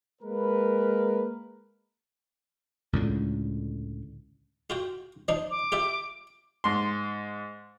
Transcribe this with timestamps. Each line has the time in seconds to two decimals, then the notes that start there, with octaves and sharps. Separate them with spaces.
0.22 G#3 A#3 A#4 B4
2.93 C#2 A2 D3
4.70 F4 F#4 G5
5.28 F3 D4 D#4
5.51 D6
5.72 F4 G4 E5
6.64 G#2 C6